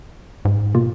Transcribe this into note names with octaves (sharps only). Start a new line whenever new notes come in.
G#2
B2 A#3 F4